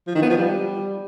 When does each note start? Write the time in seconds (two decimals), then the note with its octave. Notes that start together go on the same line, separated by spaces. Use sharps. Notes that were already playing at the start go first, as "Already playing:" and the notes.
0.08 F3
0.15 D#3
0.22 B3
0.30 F3
0.37 G3